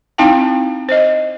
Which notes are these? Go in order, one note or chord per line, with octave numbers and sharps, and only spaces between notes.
C4 D#4 E4 F5 G5 A5
C5 D#5